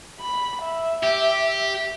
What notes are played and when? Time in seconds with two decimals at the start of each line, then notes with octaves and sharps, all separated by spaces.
0.20 B5
0.64 E5
1.03 G4